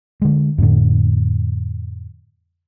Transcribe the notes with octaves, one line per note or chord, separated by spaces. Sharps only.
D3 G#3
F2 A2 D3